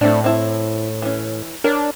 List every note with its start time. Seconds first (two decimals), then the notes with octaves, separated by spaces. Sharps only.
0.01 A2 A3 C4 D4
0.24 C4 E4 A5
1.02 E3 C#4
1.64 D4 A#4 C#5